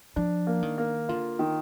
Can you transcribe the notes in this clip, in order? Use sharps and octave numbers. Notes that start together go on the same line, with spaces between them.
F3 D4
A#3
D#3
A#3
D3 F4
D#3